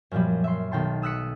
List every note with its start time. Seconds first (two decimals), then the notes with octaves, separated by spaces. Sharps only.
0.11 F#2 A#2 F3 G3
0.44 E5 C6
0.71 B1 D#3 G5 A5 C6
1.02 D#6 E6 F#6 B6 C#7